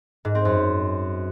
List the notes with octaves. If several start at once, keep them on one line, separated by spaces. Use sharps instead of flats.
G#2
C4
F#2